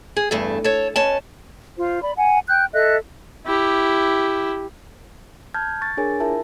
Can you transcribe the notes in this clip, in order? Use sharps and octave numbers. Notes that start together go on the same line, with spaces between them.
G#4
E2 G2 A3 A4
A4 C#5
B2 C#4 A5
F4 C5
D5 B5
F#5 G#5
G5 F#6 G6
A4 D#5 E5 F#6
E4 G4
A5 F6 G6 G#6
C#6 A6
D4 G#4 A#4 C#5 G#5
E4 F4 A#4 E5 A5